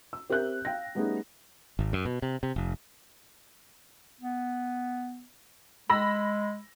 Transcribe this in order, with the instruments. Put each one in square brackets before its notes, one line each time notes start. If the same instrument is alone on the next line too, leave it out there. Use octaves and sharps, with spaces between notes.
[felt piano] E6
C4 G4 A#4 E5 F#6 G6
F5 G5 A#6
G3 A3 B3 C#4 D#4 G#4
[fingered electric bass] G#1
F#2
B2
C3
C3
F1
[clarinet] B3
[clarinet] G#3 [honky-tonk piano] B5 E6 A#6